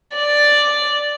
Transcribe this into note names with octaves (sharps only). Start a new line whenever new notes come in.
D5